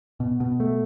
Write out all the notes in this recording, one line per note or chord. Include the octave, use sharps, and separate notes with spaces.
B2
B2
A3